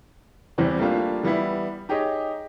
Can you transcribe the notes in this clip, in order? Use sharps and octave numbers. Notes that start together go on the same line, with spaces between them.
E2 C3 E3 G3 C4
G3 A3 A#3 D4 F4
E3 G3 B3 E4
D#4 G4 G#4 C#5 D#5